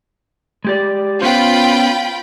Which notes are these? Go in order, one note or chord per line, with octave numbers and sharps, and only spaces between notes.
G#3 G4 D5
B3 C#4 F4 C5 G5 B5